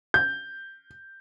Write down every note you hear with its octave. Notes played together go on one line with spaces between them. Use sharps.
G6